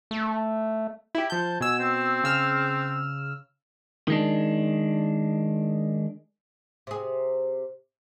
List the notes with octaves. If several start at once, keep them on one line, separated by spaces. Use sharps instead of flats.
A3
E4 G4
F3 A5 G6
B2 G#5 E6
C4
C#3 E6 F6
D#3 G#3 D4
C3 G#4